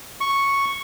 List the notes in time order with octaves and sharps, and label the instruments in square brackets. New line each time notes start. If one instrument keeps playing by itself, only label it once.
[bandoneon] C#6